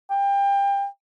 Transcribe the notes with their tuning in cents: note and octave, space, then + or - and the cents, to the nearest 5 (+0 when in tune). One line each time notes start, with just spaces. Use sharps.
G5 +25